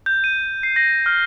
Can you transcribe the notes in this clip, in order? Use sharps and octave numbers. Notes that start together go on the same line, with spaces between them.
G6
D#7
C7
A#6
F6